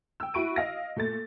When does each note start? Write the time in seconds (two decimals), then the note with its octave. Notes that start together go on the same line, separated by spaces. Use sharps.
0.20 G5 E6
0.34 E4 F#4 B5 C#6 D7 D#7
0.56 D#5 F5 A#6
0.96 A#2 A3 A6